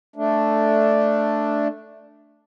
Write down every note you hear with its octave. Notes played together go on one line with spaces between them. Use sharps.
A3 D4